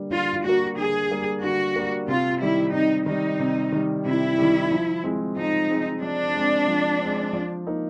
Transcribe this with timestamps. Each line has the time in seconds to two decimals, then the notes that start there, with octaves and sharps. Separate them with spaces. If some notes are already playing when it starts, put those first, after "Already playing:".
Already playing: D3 G3 A#3
0.11 D3 F4
0.44 G3 A#3 F#4
0.77 D3 G#4
1.10 G3 A#3
1.42 D3 F#4
1.76 G3 A#3
2.08 C3 F4
2.41 D#3 G3 E4
2.73 C3 D#4
3.06 D#3 G3 D#4
3.40 C3
3.72 D#3 G3
4.05 C3 E4
4.38 D#3 G3
4.71 F3
5.04 G#3 C4
5.36 F3 D#4
5.70 G#3 C4
6.02 F3 D4
6.35 G#3 C4
6.68 F3
7.01 G#3 C4
7.33 F3
7.67 A#3 D#4